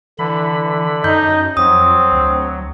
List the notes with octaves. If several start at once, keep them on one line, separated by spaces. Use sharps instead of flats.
D3 E3 B5
F#2 D#4 G6
F2 F#3 C4 D#6
D2